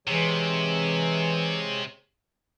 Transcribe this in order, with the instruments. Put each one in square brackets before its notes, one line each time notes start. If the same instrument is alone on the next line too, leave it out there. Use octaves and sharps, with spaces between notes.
[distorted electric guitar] C3 [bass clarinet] E3 [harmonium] G#3 G#4 C#5